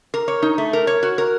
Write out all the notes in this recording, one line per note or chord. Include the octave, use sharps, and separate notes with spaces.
A#4
C#5
D#4
A3
A#4
C#5
F#4
A#4